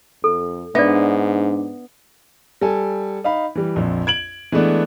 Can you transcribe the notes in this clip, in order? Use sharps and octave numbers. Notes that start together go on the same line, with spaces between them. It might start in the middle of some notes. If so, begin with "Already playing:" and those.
F2 A4
G#2 B3 D4 D5 E5
G3 A4 G#5
D#4 F5 B5
E3 G3
A#1 F2
G#6 D7 F#7
E3 G#3 A3 B3 D4